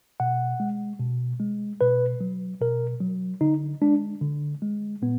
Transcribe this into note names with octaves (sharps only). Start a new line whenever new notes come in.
B2 F#5
G#3
B2
G#3
B2 B4
F#3
B2 A#4
F#3
D3 D#4
G#3 D4
D3
G#3
A#2 B3